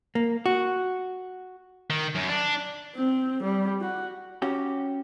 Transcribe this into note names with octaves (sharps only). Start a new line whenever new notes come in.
A#3
F#4
D#3
F#2
D4
C4
G3
F#4
C#4 F#4 G4